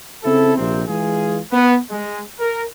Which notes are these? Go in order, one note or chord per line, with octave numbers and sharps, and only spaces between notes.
C#3 C4 E4 A4
A#1 C3 C4
E3 G#3 F4 G#4
B3
G#3
A#4